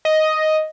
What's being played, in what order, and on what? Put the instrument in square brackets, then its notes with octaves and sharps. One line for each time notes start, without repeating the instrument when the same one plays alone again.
[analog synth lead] D#5